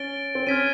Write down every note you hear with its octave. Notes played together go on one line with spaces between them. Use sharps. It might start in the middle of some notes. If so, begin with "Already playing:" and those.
Already playing: C#4 A6 D7 G7
C4
C#4 F6 G#6 B6 D#7